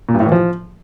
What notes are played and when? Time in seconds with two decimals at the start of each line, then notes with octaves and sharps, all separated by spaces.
0.09 A#2
0.14 G2
0.20 A2
0.26 E3
0.32 F3